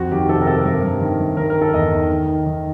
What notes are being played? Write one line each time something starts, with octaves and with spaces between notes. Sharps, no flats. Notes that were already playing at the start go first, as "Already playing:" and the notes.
Already playing: F2 F#4
D#3 G4
C3 A4
A#4
C3 A4
G2 A#4
G2
D#3
G2
D#3 A#4
A#4
D#3
A4
E2 D#5
D#3
D#3
D#3
D#3